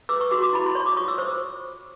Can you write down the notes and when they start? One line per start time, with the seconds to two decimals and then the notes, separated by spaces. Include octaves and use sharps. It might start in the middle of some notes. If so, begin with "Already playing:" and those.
0.09 B4 D6 E6
0.20 C#6 D#6
0.31 F#4 C6 D6
0.42 C6 D6
0.53 E4 B5
0.66 C6
0.75 C#5 C#6
0.86 D6
0.97 F4 C#6 D#6
1.08 D6 E6
1.18 C5 C#6 D#6